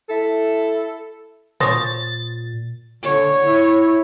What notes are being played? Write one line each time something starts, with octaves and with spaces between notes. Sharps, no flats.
E4 A4
A#2 C5 C#5 C6 D#6 A6 A#6
D3 C#5
E4